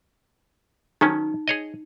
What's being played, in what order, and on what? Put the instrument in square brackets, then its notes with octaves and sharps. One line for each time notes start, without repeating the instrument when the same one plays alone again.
[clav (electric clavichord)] D#3 F#3 C#4 [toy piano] D#4
[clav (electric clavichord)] G#4 C#5 D#5